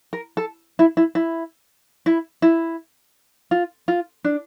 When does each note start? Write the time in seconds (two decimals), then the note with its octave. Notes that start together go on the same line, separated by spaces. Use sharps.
0.13 A#4
0.37 A4
0.79 E4
0.97 E4
1.15 E4
2.06 E4
2.42 E4
3.51 F4
3.88 F4
4.24 D4